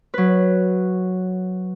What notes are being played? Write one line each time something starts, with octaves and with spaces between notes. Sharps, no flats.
F#3 B4